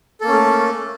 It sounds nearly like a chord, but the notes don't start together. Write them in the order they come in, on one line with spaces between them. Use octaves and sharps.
A4 A#3 C#4 A3